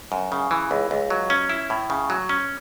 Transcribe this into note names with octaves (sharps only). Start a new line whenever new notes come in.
F#2
C#3
E3
C#2
C#2
F#3
C#4
E4
A2
C#3
F#3
C#4